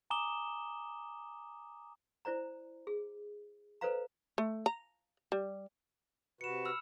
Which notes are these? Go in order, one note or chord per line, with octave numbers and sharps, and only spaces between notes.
G#5 A#5 D6 D#6 E7 G7
E4 C5 D5 A#5
G#4
A4 B4 C5 D5 F5 A#5
A3
A#5
G3
C3 F#4 B4 C#7 E7
B5 E6 F6